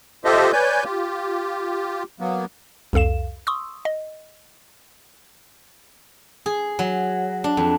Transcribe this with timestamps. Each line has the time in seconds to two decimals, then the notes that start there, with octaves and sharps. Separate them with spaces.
0.25 F4 G4 A4 C5 D#5 E5
0.52 B4 C#5 D5 G#5 G6
0.84 F4 G4
2.20 F#3 A#3 B3
2.93 C2 F2 A4 F5 E7
3.47 C6 C#6 D#6 E6
3.85 D#5
6.46 G#4
6.79 F#3
7.44 D4
7.57 F2